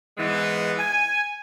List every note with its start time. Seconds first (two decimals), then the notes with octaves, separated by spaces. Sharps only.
0.18 G#2 E3 G#3 B3
0.79 G#5